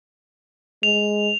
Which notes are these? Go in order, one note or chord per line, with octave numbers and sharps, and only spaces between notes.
G#3 F7